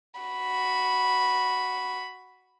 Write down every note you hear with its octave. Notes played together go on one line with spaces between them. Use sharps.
F#4 B5